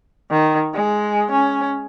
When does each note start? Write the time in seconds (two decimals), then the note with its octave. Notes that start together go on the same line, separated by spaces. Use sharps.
0.31 D#3
0.74 G#3
1.31 C#4